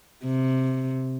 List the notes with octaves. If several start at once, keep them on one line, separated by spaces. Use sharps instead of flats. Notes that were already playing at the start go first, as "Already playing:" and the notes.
C3